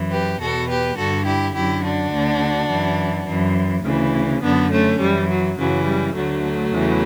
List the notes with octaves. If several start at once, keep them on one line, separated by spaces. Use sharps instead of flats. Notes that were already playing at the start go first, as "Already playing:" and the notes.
Already playing: F#2 E3
G4 B4
E2 B2 F#4 A4
G4 B4
G2 D3 F#4 A4
E4 G4
F#2 D3 E4 G4
D4 F#4
D2 D3
F#2 E3
F#2 E3
D2 C#3 E3
F#2 D3 B3 D4
A3 C#4
F#2 E3 G3
F#3
F#2 C#3 E3 F#3
G3
D2 D3 F#3 A3
E2 C#3 E3